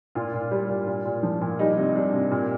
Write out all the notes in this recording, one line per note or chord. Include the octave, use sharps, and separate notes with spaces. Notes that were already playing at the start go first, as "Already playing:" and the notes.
A#2 F4
A#2
G3
A#2
A#2
A#2
F3
A#2
G3 D#4
C3
G3 D4
C3
A#2